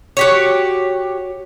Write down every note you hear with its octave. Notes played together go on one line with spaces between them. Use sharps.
F#4 G4 C#5